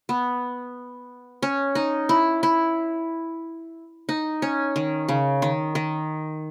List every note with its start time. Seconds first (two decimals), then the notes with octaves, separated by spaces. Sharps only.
0.09 B3
1.42 C#4
1.75 D#4
2.09 E4
2.43 E4
4.09 D#4
4.42 C#4
4.76 D#3
5.08 C#3
5.42 D#3
5.75 D#3